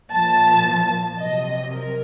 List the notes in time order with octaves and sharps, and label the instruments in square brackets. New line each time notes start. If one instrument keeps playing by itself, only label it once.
[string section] A#2 F3 A5
C3 F#3 D#5
A#4